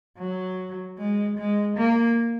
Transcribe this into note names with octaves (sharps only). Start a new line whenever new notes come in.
F#3
G#3
G#3
A#3